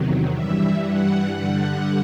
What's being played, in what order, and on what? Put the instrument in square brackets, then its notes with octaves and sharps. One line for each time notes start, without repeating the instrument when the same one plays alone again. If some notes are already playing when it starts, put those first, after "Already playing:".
Already playing: [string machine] E2 C3 D#3 F#3
G2 E3 G3 E5
F#5
G2 D3 G3 F#5